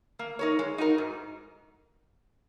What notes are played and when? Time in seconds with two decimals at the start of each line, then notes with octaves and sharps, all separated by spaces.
0.19 A#3
0.39 D#4 A#4 C#5
0.59 G#3
0.78 D#4 F#4 A#4
0.98 G#2